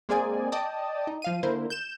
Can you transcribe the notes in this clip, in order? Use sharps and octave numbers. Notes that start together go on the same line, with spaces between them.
G#3 A#3 C4 G#4 D5 G#5
D5 D#5 G5 A5 D#6
D#4
F3 F5 D#7
D3 A#3 E4 A#4 C5
G6 E7